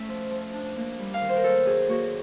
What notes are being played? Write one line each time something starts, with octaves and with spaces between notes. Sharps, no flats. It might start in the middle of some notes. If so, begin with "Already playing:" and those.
Already playing: A3 C#4 E5
F3
F3
D4
A#3
G3
F5
D#3
C5
A#4
F#3 A4
F#3 G#4
A#3 F#4